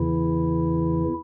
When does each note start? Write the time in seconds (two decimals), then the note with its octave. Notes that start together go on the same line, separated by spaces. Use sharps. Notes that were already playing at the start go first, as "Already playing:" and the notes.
Already playing: E2 C#3 E3 E4